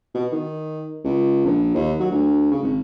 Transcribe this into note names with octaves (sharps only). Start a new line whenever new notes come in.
B2
D#3
C#2
A#1
D#2
F#3
D2
C#3
G#1